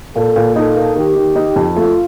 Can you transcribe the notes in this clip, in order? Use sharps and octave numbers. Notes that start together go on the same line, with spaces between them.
A#2 A4
A#2
D#4 A4
A#3
D#3 G4
D#3
D#4
F2
A3 F4